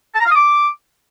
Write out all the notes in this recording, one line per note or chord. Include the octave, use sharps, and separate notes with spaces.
A5
A#5
F5
D#6
D6